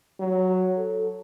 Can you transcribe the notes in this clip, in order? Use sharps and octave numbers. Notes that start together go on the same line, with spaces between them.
F#3
A4